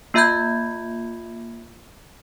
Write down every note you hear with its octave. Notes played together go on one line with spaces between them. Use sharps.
A#3 F4 E5 B5 G6 G#6